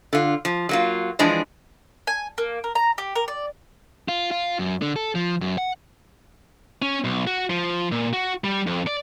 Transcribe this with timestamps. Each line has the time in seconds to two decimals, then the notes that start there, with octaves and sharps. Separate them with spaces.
0.13 D3 F4
0.45 F3
0.69 F#3 A#3 F4
1.19 E3 F3 G#3 D4 G#4
2.07 G#5
2.38 A#3
2.64 A#4
2.75 A#5
2.98 G4
3.15 A#4
3.28 D5
4.08 F4
4.31 F4
4.59 F#2
4.82 D3
4.96 A4
5.15 F3
5.41 F#2
5.58 F#5
6.82 C#4
7.04 B1
7.27 F#4
7.50 F3
7.92 A#2
8.13 F#4
8.44 G3
8.67 F2
8.87 D5